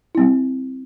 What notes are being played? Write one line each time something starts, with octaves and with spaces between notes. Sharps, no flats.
G3 C4 E4